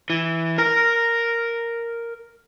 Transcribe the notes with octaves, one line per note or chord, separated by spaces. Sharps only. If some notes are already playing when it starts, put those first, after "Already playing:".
E3
A#4 A#5